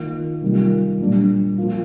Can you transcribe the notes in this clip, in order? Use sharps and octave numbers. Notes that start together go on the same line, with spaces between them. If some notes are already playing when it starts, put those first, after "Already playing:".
Already playing: D#3 A#3 F4
C3 D#3 G3 A#3 F4
A#2 G3 D4
F3 A#3 F4